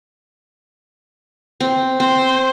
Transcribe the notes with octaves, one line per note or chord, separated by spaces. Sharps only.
C4
C4 C5